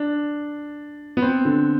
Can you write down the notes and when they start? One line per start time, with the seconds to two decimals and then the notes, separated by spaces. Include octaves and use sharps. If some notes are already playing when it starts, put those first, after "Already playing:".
Already playing: D4
1.17 B3
1.22 C4
1.45 D3